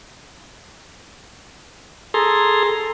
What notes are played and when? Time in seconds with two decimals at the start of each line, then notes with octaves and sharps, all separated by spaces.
2.14 G#4 A4 A#5 C6